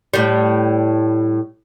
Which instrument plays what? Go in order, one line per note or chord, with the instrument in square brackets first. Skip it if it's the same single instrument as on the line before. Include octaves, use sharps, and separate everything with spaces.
[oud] A2 G3